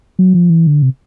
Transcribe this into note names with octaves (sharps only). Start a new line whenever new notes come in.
F#3
F3
E3
D3
C3